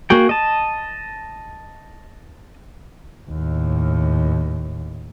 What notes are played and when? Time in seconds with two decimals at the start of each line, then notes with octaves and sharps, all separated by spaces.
0.10 A#3 F#4 G#4 G5
0.29 D#5 A5
3.30 D#2 A2